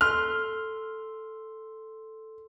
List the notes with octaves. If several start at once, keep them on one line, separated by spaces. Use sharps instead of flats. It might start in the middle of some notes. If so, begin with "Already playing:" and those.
A4 C6 F6